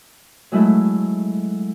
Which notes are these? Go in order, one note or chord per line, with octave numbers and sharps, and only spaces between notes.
F#3 G#3 A3 E4 F#4 A4